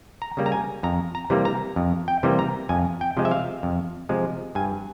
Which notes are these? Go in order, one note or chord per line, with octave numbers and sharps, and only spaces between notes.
A#5
C#3 G3 A#3
A#5
G#5
F2 A#5
A#5
C3 E3 G3 A#3
A#5
F2
G5
C3 E3 G3 A#3
A#5
F2 G#5
G5
C3 F3 G#3
E5
F5
F2
C3 F3 G#3
G2 G#5